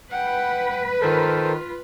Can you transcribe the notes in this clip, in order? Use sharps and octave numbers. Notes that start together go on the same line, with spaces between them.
B4 F#5 G5
D#3 F4 A4 A#4 C5